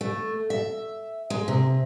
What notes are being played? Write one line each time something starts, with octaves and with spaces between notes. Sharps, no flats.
A3
E5
G#3
C3